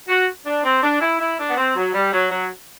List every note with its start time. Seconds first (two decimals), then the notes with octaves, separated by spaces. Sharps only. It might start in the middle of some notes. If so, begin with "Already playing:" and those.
0.09 F#4
0.46 D4
0.64 C4
0.83 D4
1.01 E4
1.20 E4
1.39 D4
1.50 B3
1.57 C4
1.76 F#3
1.94 G3
2.13 F#3
2.31 F#3